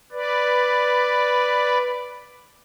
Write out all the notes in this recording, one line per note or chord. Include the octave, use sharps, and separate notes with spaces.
B4 D5